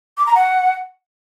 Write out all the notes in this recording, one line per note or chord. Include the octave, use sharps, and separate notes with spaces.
D6
A#5
F#5